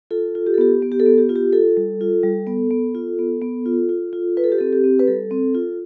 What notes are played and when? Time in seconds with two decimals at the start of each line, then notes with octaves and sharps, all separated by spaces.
0.11 F4 A4
0.35 F4
0.47 G4
0.54 A4
0.58 B3 G4
0.82 B3
0.92 G4
1.00 A4
1.06 B3
1.18 G4
1.29 F4
1.36 G4
1.53 F4 A4
1.77 G3
2.01 F4
2.23 G3
2.47 B3
2.71 B3
2.95 F4
3.19 B3
3.41 B3
3.66 F4
3.89 F4
4.13 F4
4.37 F4 B4
4.44 A4
4.52 G4
4.58 C4 A4
4.73 G4
4.84 C4
4.99 B4
5.08 G3 A4
5.31 C4
5.55 F4